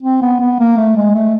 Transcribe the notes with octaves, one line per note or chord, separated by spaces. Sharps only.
C4
B3
B3
A#3
A3
G#3
A3